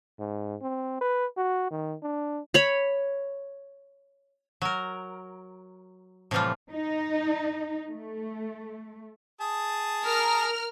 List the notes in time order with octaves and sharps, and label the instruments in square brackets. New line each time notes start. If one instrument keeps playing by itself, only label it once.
[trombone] G#2
C4
B4
F#4
D#3
D4
[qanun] C#5 B5
[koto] F#3 A#4
A2 C3 E3 F3 G3 F4
[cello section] D#4
A3
[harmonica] G#4 A5 D#6
[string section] A#4 F6